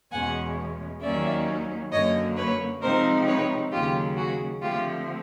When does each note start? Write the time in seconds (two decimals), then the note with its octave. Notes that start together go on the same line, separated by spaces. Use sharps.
0.12 E2 B2 G#3 C#4 F#5 G#5
1.02 D#2 D#3 F#3 A#3 C#4 D5 E5
1.92 F#2 D3 F#3 A#3 C#5 D#5
2.37 B4 C#5
2.82 C3 F3 G#3 C4 D#4 A#4 C5
3.27 B4 C#5
3.72 D#2 C#3 F#3 F4 G4
4.17 F#4 G#4
4.61 D3 F3 A3 C4 F4 G4